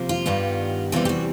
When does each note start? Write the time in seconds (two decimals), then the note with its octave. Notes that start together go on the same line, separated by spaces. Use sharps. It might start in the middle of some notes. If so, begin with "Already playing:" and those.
Already playing: C3 F3 A#3
0.09 F4
0.26 G2 D#3 G3 B3
0.92 E2 C3 E3 G3 F4
1.05 G4
1.09 F#4